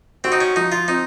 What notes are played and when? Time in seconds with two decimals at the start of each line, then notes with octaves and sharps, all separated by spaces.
0.24 C4 F#4
0.32 D#4
0.41 C#4
0.56 F3 D#4
0.72 F4
0.88 C4 D#4